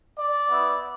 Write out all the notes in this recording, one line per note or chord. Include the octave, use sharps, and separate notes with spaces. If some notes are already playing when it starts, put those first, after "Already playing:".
D5
B3 E4